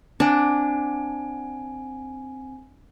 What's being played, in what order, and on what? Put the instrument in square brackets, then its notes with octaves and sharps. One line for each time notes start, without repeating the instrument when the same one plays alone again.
[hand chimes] C4 G#5 [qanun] D4